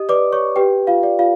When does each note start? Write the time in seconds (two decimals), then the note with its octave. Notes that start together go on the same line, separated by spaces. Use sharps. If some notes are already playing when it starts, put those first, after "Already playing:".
Already playing: G4 D#5 D#6
0.09 B4 D5 D6
0.32 C#5 C#6
0.56 G4 B4 G5
0.87 F4 F5
1.03 D5
1.19 F4 F5